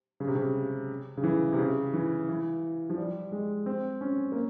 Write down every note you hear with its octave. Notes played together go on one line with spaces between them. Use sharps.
C#3
C3
C#3
C#3
E3
C3
C#3
E3
E3
F3
G3
G#3
C4
C#4
A#3